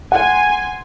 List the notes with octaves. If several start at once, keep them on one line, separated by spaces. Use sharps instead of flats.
F#5 G#5 C6